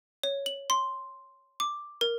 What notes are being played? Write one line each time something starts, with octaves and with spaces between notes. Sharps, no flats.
C#5
F#7
C6
D6
A#4